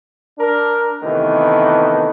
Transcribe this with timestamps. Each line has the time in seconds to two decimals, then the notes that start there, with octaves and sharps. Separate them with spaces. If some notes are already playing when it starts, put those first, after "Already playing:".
0.39 D4 A#4
1.03 C3 D#3 E3 A3 B3